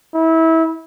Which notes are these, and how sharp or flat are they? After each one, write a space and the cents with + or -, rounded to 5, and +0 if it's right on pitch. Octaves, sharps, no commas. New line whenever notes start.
E4 -25